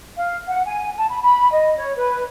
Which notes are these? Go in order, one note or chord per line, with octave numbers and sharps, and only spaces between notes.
F5
F#5
G#5
A5
B5
B5
D#5
C#5
B4